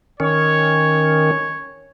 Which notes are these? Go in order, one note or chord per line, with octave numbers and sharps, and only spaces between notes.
D#3 C#4 C#5